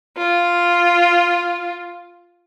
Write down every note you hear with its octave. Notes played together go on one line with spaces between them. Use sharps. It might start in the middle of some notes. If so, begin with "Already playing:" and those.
F4